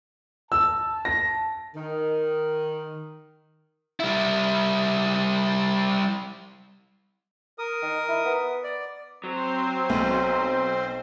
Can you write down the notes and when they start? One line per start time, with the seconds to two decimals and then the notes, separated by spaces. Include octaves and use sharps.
0.52 A5 E6
1.05 A#6
1.75 D#3
4.00 G3 E4
7.58 A#4 D#6
7.82 D#3
8.09 E4
8.25 B3
8.64 D5
9.24 F#3 C4 C5
9.90 B1